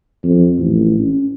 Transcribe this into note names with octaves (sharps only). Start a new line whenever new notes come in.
F2
A1
C#4